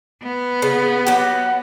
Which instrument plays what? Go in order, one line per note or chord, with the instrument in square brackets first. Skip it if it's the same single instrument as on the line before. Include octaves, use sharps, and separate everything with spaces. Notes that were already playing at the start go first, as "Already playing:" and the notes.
[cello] B3
[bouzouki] C#3
[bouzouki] F#3 G4 [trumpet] F#5